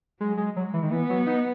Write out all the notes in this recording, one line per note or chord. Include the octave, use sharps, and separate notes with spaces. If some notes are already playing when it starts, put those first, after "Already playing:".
F#3 G#3
G#3
F#3 G#3
E3
D#3
E3 B3
F#3
D#4